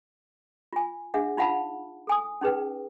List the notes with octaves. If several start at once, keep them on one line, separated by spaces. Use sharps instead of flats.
F4 G#5
D4 G#4 E5 F#5
D#4 F4 F5 F#5 A5 B5
A4 G#5 D#6
C#4 D#4 G#4 B4 G5